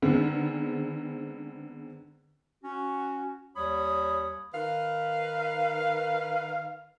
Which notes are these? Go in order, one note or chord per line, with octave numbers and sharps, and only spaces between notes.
D3 D#3 G#3 B3 C4
C#4 F#4
D#2 G3 C#5 B5 D#6
D#3 A#4 B4 F5